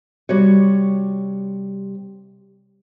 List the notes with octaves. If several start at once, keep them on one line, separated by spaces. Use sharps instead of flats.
C3 G3 F#4 C#5